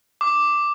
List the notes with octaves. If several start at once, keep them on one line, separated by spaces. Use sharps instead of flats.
D6